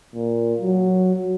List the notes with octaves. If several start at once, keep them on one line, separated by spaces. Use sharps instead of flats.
A#2
F#3